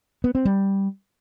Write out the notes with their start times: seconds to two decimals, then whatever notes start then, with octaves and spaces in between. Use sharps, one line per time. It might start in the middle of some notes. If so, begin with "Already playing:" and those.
0.24 B3
0.35 C4
0.45 G3